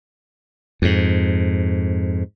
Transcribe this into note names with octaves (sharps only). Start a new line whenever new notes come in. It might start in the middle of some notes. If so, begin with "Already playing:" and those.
F2 G#2